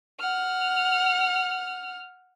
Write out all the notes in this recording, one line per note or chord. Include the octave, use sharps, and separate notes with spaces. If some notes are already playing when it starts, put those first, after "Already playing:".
F#5 F6